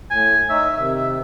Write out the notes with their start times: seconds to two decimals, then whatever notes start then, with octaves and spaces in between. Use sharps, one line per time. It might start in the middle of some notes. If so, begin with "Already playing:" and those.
0.10 A2 G#5
0.50 D#4 C#5 E5
0.77 C3 D#3 E5